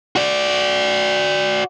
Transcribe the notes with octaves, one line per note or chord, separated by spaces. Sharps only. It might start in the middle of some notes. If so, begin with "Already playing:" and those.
F#4 D5